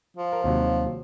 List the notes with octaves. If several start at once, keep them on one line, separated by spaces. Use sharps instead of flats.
F3
A#4
D#2 C3 F#3